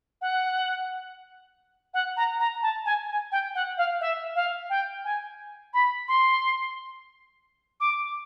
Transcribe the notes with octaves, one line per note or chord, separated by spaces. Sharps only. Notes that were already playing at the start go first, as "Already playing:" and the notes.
F#5
F#5
A#5
A#5
A5
G#5
G#5
G5
F#5
F5
E5
F5
G5
G#5
B5
C6
D6